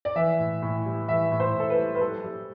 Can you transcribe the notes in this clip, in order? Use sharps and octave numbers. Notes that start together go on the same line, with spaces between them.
D5
E3 E5
A2
A2
G3
E3 E5
A2
C5
A2 A4
B4
G3
B4
G3 A4
G3